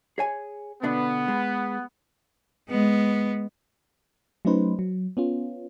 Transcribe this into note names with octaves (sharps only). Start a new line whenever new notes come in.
G#4 C#5 G#5
B2 D3 B3 D4
G#3
G#3 B3
F#3 A3 C#4 D#4 B4 C5
F#3
B3 C#4 F4